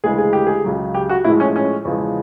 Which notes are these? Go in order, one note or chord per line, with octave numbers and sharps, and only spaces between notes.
D2 C#3 E3 G#3 G#4
G#4
G4
G#4
C#2 C#3 F#3
G4
F#4
A2 F3 G#3 E4
C#4
C#4
E2 C#3 F3 G#3